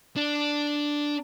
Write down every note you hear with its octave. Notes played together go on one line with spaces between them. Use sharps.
D4